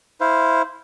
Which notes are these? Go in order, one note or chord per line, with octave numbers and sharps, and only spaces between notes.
E4 C5 F5